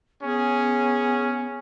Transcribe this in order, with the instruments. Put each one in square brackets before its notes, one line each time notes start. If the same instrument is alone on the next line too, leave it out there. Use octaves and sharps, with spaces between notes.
[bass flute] B3 [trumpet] C#4 [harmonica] G#4